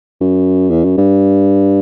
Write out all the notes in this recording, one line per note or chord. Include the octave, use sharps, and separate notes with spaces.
F#2
E2
F#2
G2